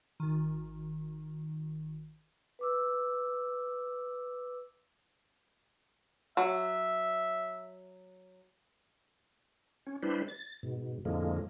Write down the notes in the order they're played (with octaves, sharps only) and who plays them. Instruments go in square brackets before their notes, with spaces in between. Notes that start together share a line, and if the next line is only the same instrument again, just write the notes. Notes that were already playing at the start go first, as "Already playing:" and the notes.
[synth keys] G#1 D#3
[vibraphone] B4 D6 E6
[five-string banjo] F#3 [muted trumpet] E5
[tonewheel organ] C#4
G3 D4 E4 B4 C5
A6
G#2 B2
F2 A2 D3 F3 G#3 A#3